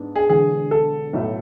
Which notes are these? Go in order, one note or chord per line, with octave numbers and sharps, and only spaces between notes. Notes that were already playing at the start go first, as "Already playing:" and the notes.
Already playing: G#2 G#3 B3 D4
G#4
E1 E2 D3 G#4
A4
B1 A2 F#3 A3